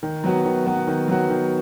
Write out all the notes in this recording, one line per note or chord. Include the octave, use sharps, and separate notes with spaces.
D#3
F#3 B3 F#4
D#3
F#3 B3 F#4
D#3
F#3 B3 F#4
D#3